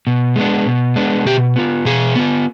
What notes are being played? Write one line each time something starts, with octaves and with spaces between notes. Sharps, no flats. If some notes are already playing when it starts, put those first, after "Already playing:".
B2
G#3 B3 D4
B2
G#3 B3 D4
B2 G4
B3 F4
B2 G#4
B3 F4